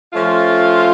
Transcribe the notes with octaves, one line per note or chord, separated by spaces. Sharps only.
F3 A3 C#4 F4